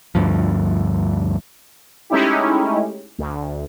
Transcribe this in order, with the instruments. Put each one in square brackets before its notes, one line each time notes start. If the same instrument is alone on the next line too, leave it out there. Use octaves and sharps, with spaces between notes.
[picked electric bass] D2 G2 F3
[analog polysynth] G#3 A3 C#4 D#4 E4 G4
D2